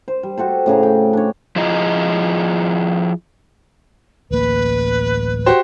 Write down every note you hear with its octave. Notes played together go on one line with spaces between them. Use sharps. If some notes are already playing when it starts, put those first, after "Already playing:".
C5
G3
F#4 G4 A4 C5
A2 C#3 G#4 A#5
G5
D4 C#5
F3 E4 F4 G#4 D#5 A#5
D1 A1 A#3 B4
F#4 G4 C5